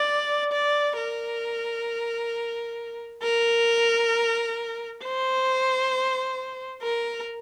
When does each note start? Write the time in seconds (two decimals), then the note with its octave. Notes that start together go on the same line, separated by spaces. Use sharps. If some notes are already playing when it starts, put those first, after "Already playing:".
Already playing: D5
0.52 D5
0.97 A#4
3.23 A#4
5.03 C5
6.82 A#4